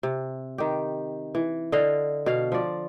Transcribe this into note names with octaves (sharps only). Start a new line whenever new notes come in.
C3
D#3 G4
E3
D3 D#5 F5
B2 F5
F3 D5